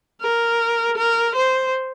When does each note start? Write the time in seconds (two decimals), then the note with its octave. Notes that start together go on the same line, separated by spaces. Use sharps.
0.21 A#4
0.97 A#4
1.36 C5